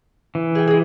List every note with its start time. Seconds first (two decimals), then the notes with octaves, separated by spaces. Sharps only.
0.35 E3
0.55 G#4 G5
0.67 G#3 G#4